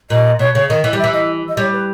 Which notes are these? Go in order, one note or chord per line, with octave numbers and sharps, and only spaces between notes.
A#2 D#5
B2 C#5
C#3 C#5
D#3 D#5
E3
G3
E5
E3
D#5
D#5
G3 C#5
B4